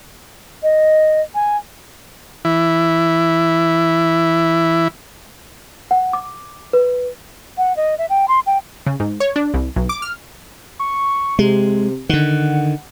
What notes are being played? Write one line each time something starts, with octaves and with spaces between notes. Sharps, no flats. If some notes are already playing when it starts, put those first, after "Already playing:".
D#5
G#5
E3 E4
F#5
D6
B4
F#5
D#5
E5
G5
C6
G5
C#3
G#2
C#5
D4
C2
B1
D6
F6
C#6
C3 G#3
D3 D#3 F#5